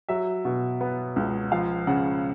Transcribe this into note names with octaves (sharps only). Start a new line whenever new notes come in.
F#3 E5
B2
B3
C#2
F3 F5
C#3 F#5